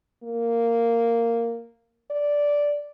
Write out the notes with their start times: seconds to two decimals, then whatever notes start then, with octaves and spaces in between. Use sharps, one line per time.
0.24 A#3
2.11 D5